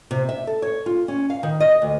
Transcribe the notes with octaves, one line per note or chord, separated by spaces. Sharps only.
C3
E5
A4
C#5
F4
C#4
F5
D#3
D#5
D2